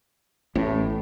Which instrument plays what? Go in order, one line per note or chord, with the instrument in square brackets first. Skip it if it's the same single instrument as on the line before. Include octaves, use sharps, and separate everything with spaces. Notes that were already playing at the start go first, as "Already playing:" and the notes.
[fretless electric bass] A1 A2